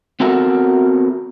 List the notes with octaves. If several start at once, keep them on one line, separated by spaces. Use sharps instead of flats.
B3 C4 F#4 A4 A#4 E5